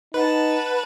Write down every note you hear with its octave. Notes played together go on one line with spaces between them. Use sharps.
D#4 B4 F#5 A5